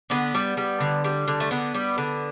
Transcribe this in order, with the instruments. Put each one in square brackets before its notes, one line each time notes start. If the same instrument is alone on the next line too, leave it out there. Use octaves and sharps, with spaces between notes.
[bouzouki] D3 B3
G3
G3
D3
G3
D3
A3
D3 B3
G3
D3